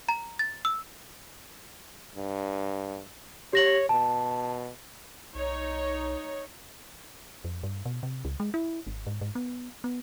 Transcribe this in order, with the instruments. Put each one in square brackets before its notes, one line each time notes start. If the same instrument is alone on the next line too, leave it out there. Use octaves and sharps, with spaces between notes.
[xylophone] A#5
A6
E6
[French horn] G2
[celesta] G4 A#6 F#7 [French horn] C#5
[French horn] B2 [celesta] A5
[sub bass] B1 [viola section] D#4 C#5
[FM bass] F2
G2
B2
C3
C#2
G#3
E4
G#1
G#2
G#2
B3
B3